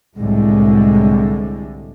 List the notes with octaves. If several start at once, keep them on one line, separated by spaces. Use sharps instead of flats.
C2 A2 D3 G3 G#3